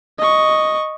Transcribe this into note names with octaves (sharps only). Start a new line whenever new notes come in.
D#5 C#6